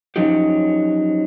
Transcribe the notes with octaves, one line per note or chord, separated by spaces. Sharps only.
F3 F#3 C#4 D#4 G4